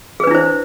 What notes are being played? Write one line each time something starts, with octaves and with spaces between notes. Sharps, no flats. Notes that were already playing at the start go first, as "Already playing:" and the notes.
D4 E4 G#4 B4 C5